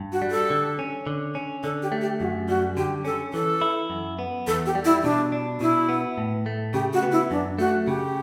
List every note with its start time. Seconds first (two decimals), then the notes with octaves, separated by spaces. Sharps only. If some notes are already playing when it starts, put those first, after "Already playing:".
Already playing: G2
0.12 F#4
0.22 G3
0.31 A4
0.50 D3
0.79 C#4
1.07 D3
1.35 C#4
1.63 D3 A4
1.82 G4
1.92 A3
2.01 G4
2.20 F#2 F#4
2.48 G3 F#4
2.77 D3 G4
3.05 C#4 A4
3.34 E3 A4
3.61 E4
3.90 F#2
4.19 B3
4.47 E2 A4
4.66 G4
4.75 G3
4.85 E4
5.03 B2 D4
5.32 D4
5.61 B2 E4
5.89 B3
6.18 A2
6.46 A3
6.74 C#3 G4
6.93 F#4
7.03 B3
7.12 E4
7.31 F#2 D4
7.58 A3 F#4
7.87 C#3 G4